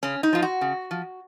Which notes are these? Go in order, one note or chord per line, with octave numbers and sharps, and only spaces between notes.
C#3 C#4
D#4
F3 F4
F#4
C#3
F3